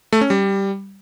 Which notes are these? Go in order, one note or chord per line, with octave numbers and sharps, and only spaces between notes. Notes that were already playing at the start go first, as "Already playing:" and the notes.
A3
C#4
G3